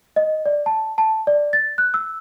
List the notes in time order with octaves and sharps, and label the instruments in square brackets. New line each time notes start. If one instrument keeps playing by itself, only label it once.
[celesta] D#5
D5
A5
A5
D5
A6
F#6
E6